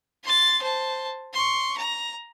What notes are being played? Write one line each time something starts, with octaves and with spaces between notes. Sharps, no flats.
C6 A6
C5 A5
C6 C#6
A#5